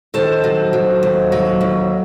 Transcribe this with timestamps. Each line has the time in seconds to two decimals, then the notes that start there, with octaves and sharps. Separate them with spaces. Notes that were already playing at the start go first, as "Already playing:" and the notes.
0.14 D#3 A4 C5
0.44 F#3
0.73 F#3
1.03 D#2
1.32 F#3
1.61 D#2